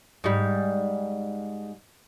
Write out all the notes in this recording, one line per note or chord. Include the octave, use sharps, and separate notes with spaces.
G#2 G3